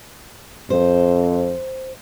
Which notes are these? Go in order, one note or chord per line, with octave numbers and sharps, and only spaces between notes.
F2 C5